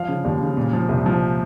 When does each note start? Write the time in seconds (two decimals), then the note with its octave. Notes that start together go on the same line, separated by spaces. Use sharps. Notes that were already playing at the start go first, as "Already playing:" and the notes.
Already playing: F3 F5
0.08 C#3
0.25 D#2
0.41 C#3
0.57 A#2
0.73 F3
0.89 C2
1.06 F3